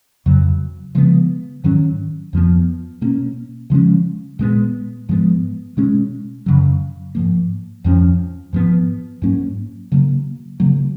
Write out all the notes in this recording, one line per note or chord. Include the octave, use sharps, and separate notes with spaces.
F2 C#3 F#3
C#3 F3 G#3 B3
G#2 D#3 F#3 C#4
F2 F3 B3
B2 A#3 C#4
C#3 F3 G#3 C#4
A#2 G#3 B3
G#2 F3 G#3 B3
B2 G#3 C#4
F#2 C#3 F#3
G#2 F3 A#3
F2 F3 A#3 C#4
G#2 F3 B3
G#2 F#3 A#3 C#4
C#3 F#3 A#3
C#3 F#3 A#3